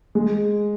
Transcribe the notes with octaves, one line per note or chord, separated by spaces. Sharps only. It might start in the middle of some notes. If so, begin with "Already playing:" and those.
G#3